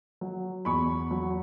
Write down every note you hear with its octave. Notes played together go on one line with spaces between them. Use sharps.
F#3
E2 B5 C#6
F#3